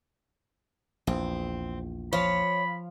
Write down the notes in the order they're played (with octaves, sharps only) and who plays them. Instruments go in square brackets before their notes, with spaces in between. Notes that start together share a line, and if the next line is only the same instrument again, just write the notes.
[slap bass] A#1 E2 [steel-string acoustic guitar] C4
[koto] F3 F5 [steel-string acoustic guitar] C#5 [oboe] B5